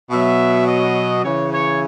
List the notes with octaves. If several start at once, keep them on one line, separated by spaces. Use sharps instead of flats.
B2 F#3 E5
D#5
C#3 E3 C#5
C#5